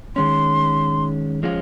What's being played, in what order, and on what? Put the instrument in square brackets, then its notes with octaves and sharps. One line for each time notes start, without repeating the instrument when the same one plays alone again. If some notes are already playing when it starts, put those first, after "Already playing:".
[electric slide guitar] D#3 G#3 C#4 [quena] C6
[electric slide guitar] F3 G#3 C#4 F4